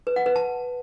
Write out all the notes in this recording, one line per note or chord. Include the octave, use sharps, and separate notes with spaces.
B4
F#5
B4
A5